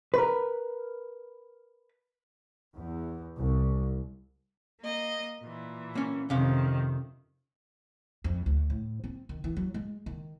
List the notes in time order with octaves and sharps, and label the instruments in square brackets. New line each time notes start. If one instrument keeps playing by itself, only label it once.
[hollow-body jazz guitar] A#4 B4
[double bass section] E2
C2
[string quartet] A#3 D#5
A#2 E3
[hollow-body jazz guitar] A#3 C#4
[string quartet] F2 D#3 [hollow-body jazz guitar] C3 C#4 F5
[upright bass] F2
D2
A2
C4
D#3
E3
F#3
G#3
D#3